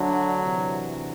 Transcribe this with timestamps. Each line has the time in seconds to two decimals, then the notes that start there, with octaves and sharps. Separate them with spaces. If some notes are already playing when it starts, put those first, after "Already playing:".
Already playing: D2 D3 F#3
0.41 D2 C3 E3